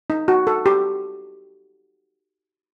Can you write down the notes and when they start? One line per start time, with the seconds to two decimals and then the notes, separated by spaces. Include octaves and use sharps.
0.10 D#4
0.28 F#4
0.47 A4
0.66 G4